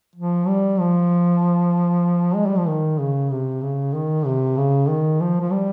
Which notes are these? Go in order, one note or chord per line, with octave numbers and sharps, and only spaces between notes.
F3
G3
F3
G#3
G3
F3
D#3
C#3
C3
C#3
D#3
C3
C#3
D#3
F3
F3
G3